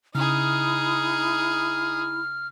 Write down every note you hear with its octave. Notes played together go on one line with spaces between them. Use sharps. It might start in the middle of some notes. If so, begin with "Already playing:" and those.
C#3 D#4 E4 G#4 F6